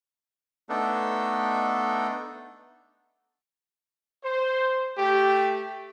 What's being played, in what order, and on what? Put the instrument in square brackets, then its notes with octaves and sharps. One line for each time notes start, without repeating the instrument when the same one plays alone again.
[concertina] A3 B3 D4 D#4 A4
[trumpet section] C5
A3 G4